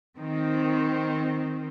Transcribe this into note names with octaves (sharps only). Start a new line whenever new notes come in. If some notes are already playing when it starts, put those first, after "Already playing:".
D#3 C4